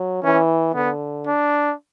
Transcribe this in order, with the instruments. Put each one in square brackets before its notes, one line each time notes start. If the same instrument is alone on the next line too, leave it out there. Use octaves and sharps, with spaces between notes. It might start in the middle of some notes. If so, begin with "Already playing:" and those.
Already playing: [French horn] F#3
[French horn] E3 [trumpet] C#4
[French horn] D3 [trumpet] B3
[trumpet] D4